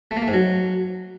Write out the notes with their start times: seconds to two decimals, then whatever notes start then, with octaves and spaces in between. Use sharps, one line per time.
0.11 A3
0.17 A#3
0.22 A3
0.28 G#2
0.33 F#3